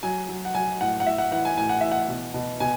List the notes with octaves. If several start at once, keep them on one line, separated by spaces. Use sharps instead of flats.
F#3 G#5
F#3
F#5
F#3 G#5
A2 F#5
F#5
A2 E5
F#5
E3 F#5
G#5
A2 G#5
F#5
E3 E5
F#5
B2
B2
B2 G#5